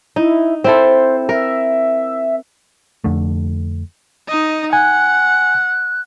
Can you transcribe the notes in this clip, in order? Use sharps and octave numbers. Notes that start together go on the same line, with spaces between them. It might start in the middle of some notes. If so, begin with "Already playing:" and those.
D#4 E4
C4 E4 A4 C5
A#4 E5
F2 D3 A3
D#4 D#5
F#5 G#5 F#6